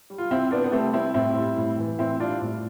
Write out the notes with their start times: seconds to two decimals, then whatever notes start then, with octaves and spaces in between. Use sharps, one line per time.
0.10 G3
0.18 F4
0.30 C3 C4 E4
0.51 C3 B3 D4
0.64 B3
0.72 G3 A3 C4
0.93 G3 C4 E4
1.14 A2 C4 E4
1.35 G3
1.58 A2
1.78 E3
1.99 A2 C4 E4
2.20 G3 D4 F4
2.41 A2